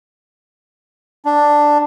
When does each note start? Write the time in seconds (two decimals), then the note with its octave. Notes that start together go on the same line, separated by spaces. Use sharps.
1.25 D4